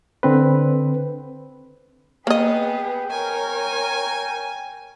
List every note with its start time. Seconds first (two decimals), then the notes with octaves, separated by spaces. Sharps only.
0.23 D3 C4 B4
2.27 A#3 B3 G#4 B4 D#5 G5
3.11 A#4 C#5 G#5